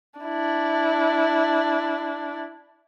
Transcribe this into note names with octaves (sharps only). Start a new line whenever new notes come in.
D4 E4